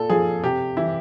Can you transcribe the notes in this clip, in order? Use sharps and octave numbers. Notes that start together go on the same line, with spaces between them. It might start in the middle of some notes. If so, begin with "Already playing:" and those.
Already playing: A#2 A4
F3 G#4
C3 G4
E3 E4